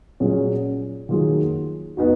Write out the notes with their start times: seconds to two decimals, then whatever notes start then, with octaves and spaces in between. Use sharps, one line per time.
0.20 A#2 F#3 C#4 G#4
1.09 D#3 F#3 A#3 F4 G#4
1.97 B3 D#4 F#4